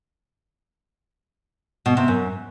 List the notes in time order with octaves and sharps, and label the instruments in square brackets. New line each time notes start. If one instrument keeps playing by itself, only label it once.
[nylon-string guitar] B2
C3
F#2